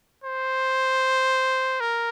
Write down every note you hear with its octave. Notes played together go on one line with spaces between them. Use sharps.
C5
A#4